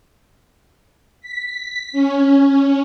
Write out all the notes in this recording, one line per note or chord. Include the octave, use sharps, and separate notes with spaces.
B6
C#4